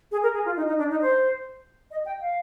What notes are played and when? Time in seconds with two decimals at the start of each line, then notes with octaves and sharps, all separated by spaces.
0.12 G#4
0.23 A#4
0.34 G#4
0.45 F4
0.57 D#4
0.67 D#4
0.78 D4
0.90 D#4
1.02 C5
1.91 D#5
2.06 G5
2.21 F5